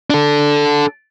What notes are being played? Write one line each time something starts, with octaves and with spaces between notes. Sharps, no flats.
D4 A4